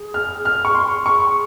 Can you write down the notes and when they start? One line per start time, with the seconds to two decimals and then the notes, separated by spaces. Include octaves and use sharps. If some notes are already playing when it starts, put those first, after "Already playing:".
Already playing: G#4
0.14 F6
0.45 F6
0.65 C#6
0.75 C6
1.06 G#4 C#6